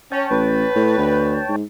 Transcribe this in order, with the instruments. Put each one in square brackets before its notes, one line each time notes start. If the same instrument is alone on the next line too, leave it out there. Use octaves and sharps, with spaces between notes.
[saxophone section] C#4 [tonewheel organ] C#5 G5 A5
[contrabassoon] A1 [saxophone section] B4
[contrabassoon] A2
D2
G#2